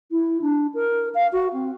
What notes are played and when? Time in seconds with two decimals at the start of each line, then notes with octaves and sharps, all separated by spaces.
0.12 E4
0.42 D4
0.74 A#4
1.15 F5
1.33 F#4
1.53 C4